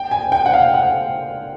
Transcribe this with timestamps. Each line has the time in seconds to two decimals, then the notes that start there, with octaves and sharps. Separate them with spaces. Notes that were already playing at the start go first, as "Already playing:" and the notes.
Already playing: G5
0.11 G#5
0.32 G5
0.46 F#5
0.54 F5
0.74 F#5